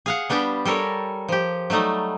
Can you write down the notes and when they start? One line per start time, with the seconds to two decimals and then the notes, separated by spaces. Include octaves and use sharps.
0.06 G#4 F5 F#5
0.30 G3 B3 D4 G4
0.65 G3 A4 A#4 C#5
1.28 F3 G4
1.70 F#3 G3 A3 D#4